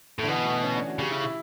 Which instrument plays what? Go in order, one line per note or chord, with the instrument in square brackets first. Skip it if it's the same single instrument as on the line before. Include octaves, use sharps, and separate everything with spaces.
[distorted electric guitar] A2 [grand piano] D3
[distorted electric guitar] B2 [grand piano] E3
[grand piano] A3
C#4
D4
F#4
[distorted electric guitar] C#3 [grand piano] G4
[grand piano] E4
E4